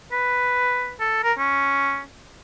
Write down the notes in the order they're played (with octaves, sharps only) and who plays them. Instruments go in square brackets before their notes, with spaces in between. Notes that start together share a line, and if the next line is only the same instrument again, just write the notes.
[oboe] B4
A4
A#4
C#4